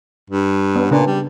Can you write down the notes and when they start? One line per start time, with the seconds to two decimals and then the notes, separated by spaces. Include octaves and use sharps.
0.30 G2
0.76 B3 C#4
0.91 A#2 C#3 D4 B4
1.07 G3